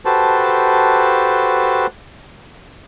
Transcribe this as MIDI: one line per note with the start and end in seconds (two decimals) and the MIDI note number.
0.05 1.87 66
0.05 1.87 67
0.05 1.87 69
0.05 1.87 71
0.05 1.87 72
0.05 1.87 81